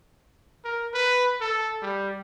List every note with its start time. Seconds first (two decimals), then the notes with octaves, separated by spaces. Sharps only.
0.65 A#4
0.94 B4
1.41 A4
1.82 G3